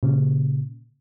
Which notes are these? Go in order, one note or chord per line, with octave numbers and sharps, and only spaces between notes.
A#2 C#3